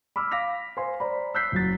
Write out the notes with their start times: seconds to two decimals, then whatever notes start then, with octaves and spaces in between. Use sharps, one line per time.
0.16 B5 D6 E6 F6
0.31 F5 D6 A#6 B6 F7
0.77 C5 F5 G#5 C6
1.00 C5 D5 A#5 B5
1.35 E6 F#6 G6 B6 C7
1.52 F#1 F#3 A6